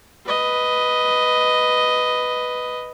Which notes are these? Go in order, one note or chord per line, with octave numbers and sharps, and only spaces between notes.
B4 D#5